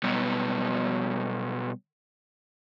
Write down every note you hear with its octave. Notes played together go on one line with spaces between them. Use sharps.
B2 F#3 G3 B3